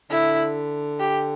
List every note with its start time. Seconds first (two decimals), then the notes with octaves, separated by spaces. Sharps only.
0.11 D3 E4
1.00 G4